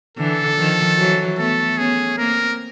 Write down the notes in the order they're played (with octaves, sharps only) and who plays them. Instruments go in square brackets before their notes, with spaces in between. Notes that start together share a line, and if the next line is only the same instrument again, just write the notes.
[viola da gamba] D3 E3 [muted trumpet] A4
[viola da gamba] D#3 F3
E3 F#3
[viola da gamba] A3 B3 [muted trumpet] A4
[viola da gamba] B3 C#4 [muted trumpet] G#4
[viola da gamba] A#3 C4 [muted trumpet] A#4